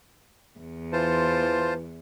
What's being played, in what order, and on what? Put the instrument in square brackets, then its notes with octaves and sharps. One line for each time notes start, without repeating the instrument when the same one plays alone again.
[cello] E2
[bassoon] E3 [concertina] F4 C5 A5